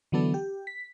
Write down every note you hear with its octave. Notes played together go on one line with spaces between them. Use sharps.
D3 E3 F#3 B3 D4 A4
G4
B6